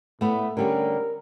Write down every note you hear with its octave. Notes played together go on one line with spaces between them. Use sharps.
A2 A3 B3
D3 G3 C#4 A#4